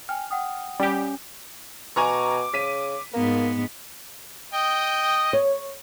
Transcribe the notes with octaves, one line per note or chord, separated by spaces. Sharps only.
G5 G#5 F6
F#5 G5 D#6
G3 C#4 G4
B2 G#5 A#5 C#6 D6
C#3 B6 D#7
G#2 A#3 B3
D#5 G5 D#6
C#5